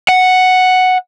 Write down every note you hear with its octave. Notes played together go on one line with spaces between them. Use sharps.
F#5